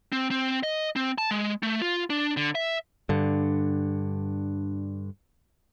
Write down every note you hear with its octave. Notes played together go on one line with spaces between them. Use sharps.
C4
C4
D#5
C4
A5
G#3
A3
F4
D4
D3
E5
G2 D3